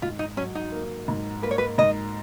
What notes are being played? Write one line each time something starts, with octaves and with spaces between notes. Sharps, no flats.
G#2 F4
D#4
F#3 C#4
D#4
A#3
G#2
A#3 B4
C#5
B4
G#2 D#5